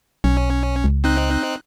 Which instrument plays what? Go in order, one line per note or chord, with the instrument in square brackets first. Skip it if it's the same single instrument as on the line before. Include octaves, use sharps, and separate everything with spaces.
[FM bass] B1 [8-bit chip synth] C#4
[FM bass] C#2
[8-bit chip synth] C4 D#4 F#6